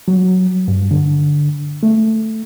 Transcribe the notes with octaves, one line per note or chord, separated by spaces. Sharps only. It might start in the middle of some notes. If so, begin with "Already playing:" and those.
F#3
G2
D3
A3